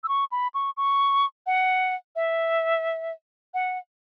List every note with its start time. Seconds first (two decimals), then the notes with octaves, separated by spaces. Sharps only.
0.04 E6
0.08 C#6
0.32 B5
0.54 C#6
0.77 C#6
1.47 F#5
2.16 E5
3.54 F#5